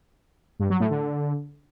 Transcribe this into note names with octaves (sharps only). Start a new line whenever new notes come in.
G2
F#3
A2
D3